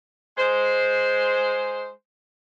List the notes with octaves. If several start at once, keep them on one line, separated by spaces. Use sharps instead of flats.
G#3 C5